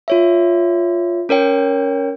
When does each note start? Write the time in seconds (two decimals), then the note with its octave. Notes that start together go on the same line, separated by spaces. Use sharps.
0.08 F4 C#5 E5
1.29 C#4 A#4 C#5 G5